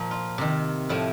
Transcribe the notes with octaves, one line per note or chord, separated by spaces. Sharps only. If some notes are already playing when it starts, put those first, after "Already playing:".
Already playing: A#2 F3
F4
C3 D#3
A2 F3 E4